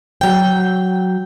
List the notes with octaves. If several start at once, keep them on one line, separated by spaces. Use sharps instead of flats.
F#3 G5